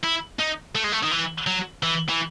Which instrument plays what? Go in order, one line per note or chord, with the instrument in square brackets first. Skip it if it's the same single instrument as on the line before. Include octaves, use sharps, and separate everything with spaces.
[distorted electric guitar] E4
D#4
A3
G#3
A3
D#3
E3
F#3
E3
E3